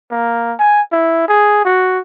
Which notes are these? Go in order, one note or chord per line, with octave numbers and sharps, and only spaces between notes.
A#3
G#5
E4
G#4
F#4